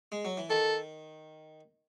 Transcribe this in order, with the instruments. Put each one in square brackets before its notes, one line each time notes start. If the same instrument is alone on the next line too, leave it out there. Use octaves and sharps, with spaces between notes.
[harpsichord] G#3
F#3
E3
[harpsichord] D#3 [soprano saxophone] A4